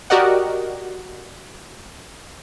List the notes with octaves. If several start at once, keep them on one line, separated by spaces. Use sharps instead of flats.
F#4 G4 A#4 D5 D#5 F#5